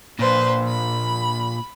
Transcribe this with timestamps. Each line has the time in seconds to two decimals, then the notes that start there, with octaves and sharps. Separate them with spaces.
0.19 A#2 D4 B4 C5
0.69 B5